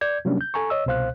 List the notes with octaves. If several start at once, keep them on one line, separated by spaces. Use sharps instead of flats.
D5 G6 G#6
C3 F#3 G3 A#3 C#4 D4
G6
A4 G#5 A#5 C#6
C#5 D#5 E6
C2 B2 C5 F5 F#6